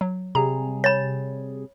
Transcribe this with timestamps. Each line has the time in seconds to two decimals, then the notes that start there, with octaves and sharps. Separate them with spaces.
0.01 F#3
0.35 C3 G3 G#4 A#5
0.84 C#5 B5 A6